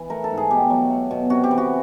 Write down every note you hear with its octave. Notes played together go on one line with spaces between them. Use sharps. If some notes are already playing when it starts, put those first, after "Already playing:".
Already playing: E3
A3 A#4
A4
G#2
G#4
B2 G4
F#3
A3
B2
C3 F#4
G4
E3
F#4